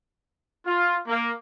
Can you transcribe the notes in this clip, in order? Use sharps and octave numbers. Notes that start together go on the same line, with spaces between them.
F4
A#3